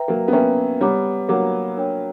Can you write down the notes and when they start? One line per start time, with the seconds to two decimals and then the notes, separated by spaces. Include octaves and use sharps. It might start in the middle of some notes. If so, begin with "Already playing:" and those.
Already playing: B4 E5 G5 A#5
0.08 F#3 A#3
0.28 B3
0.33 A#3 C#4 B4 E5 G5 A#5
0.81 G3 B3 C#5 F#5 A#5 D6
1.29 F#3 A#3 C#5 F#5 A#5 D6
1.77 D4 A#4 C#5 G5